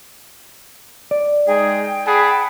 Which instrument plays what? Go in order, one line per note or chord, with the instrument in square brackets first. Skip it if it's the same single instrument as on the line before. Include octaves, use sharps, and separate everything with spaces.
[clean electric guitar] D5
[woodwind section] G#3 D#4 G#4 [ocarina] G5
[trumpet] G#4 [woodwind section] F#5 A5 B5